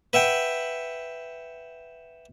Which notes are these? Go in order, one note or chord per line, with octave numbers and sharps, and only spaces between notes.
B4 E5 F#5 G5